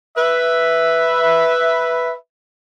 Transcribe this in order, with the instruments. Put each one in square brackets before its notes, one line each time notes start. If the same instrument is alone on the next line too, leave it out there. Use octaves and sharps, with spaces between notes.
[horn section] B4 E5